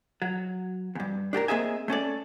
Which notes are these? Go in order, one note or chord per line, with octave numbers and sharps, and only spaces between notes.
F#3
E2 G2
D4 G4 A4 A#4
A#3 C4 G#4 D#5 E5 G#5
A3 C#4 A4 D5